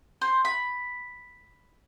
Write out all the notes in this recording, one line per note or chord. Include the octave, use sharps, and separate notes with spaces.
C5
B5